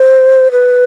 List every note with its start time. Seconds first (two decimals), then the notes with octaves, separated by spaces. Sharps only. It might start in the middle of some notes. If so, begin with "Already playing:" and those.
Already playing: C5
0.52 B4